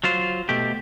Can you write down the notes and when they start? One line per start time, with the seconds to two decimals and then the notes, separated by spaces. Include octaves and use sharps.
0.04 F#3 F4 C5
0.49 B2 A3 G4